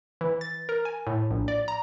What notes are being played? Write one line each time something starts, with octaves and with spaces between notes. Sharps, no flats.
E3
A6
A#4
G#5
A2
A#1
D5
A#5